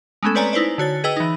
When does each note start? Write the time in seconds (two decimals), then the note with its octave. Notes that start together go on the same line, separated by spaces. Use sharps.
0.23 G#3 A3 B3 C#4 A4
0.35 C4 B4 C#5 D5 G#5 A#5
0.53 D#4 E4 B4 C5 D5
0.78 D3 F#4 C#5 A6
1.04 G#4 B4 D#5 G5 E6
1.17 E3 D#4